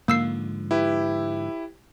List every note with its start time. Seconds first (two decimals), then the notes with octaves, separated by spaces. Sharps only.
0.08 G#2 D3 F3 A#3 E6 C7
0.71 E4 G4 B4